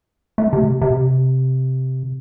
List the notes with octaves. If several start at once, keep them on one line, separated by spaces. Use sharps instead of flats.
A3
C3
C3